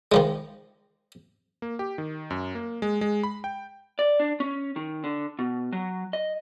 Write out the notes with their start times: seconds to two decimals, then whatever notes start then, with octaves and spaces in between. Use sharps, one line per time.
0.12 D#3 F3 G#3
1.62 A#3
1.79 G4
1.98 D#3
2.30 F#2
2.55 A#3
2.82 G#3
3.01 G#3
3.23 B5
3.44 G5
3.99 D5
4.20 D4
4.40 C#4
4.76 D#3
5.04 D3
5.39 B2
5.72 F#3
6.13 D#5